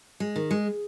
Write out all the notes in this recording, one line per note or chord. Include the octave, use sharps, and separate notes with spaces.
G#3
D#3
G#3